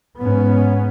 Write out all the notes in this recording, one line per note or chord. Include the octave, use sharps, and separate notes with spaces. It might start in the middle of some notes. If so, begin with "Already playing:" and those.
G#2 B3 C#4